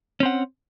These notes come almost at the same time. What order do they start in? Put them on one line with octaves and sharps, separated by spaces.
C#4 C4 F#5